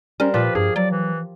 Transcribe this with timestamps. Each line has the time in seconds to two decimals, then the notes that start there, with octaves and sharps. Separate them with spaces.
0.20 G3 C#4 A#4 C5
0.34 A#2 F3 F4 G4 B4
0.55 G2 G#4
0.76 F#3 D5
0.91 E3